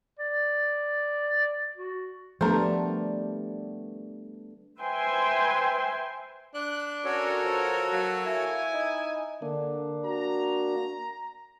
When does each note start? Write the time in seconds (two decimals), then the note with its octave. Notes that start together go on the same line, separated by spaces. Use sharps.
0.19 D5
1.76 F#4
2.41 F3 G3 A3 B3 D4 A#4 C5
4.80 B4 C5 E5 G5 G#5 C6
6.54 D4 F#6
7.05 C#4 F#4 A4 A#4 C#5
7.43 F3
7.92 F#3 A#3
8.26 E4 G#5
8.74 D#4
9.42 D3 A#3 D4
10.05 F#4 A#5